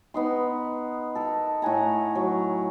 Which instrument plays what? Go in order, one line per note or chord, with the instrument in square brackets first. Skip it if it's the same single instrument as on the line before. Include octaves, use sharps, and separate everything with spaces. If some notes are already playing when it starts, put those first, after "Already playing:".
[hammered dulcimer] B3 D#4 C6
A4 A#4
A2 F#5 G#5 A#5
F#3